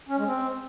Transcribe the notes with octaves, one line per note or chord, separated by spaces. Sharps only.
C#4
G#3
C4